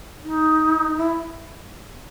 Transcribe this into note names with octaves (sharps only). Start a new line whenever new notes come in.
D#4
E4